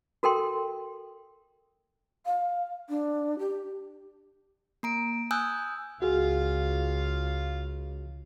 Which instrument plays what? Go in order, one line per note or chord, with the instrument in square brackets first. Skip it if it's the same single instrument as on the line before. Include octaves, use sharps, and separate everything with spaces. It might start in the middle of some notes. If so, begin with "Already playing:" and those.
[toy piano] F#4 A4 A#4 G5 C6
[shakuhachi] F5
D4
G4
[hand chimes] A#3 A#5 D7
G#5 D#6 E6 F#6 G6
[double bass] C#2 [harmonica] F4 F5 [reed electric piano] F#4 G#4